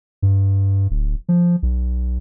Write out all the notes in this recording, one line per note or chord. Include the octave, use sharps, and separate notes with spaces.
G2
D1
F3
B1